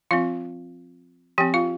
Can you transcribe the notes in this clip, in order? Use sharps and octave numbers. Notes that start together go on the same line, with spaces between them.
F3 C4 F4 F5
F3 C4 G4 G5
F4 F5